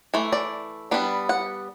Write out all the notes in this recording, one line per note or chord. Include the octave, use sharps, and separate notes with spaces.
E3 A3
D5
G3 B3 D4
F#5